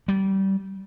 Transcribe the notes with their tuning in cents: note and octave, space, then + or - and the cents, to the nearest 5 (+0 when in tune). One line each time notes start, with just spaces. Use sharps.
G3 -25